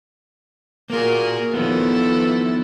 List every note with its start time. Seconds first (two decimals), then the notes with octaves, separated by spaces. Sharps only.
0.90 A#3 F4 F#4 G#4 A#4
1.54 D#3 F3 B3 E4 A4